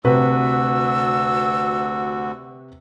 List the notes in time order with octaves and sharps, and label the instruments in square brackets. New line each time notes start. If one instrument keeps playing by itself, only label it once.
[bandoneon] D2 F#4 [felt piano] C3 B4 [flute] E6